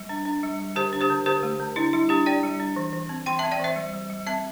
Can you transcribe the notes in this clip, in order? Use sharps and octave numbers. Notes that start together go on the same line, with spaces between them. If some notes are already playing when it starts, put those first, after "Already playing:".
Already playing: G3
D4
D4
G3
G3
D3 G4 C5
D4
G4 C5
D3
D3 G4 C5
A3
D3
D4 E4
G3 E4
D4 G4
D4 D5 G5
G3
D4
E3
E3
C4
E3 G5 C6
C4 E5 A5
D5 G5
E3 C5 E5
G3
G3
G3
C4 E5 A5